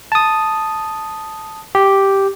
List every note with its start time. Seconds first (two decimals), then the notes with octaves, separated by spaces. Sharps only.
0.12 A5 D#6
1.75 G4